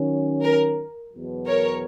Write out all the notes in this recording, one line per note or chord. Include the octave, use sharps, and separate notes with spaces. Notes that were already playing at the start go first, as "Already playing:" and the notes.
Already playing: D#3 F#3 C#4
A#4
E2 B2 F#3
A#4 C#5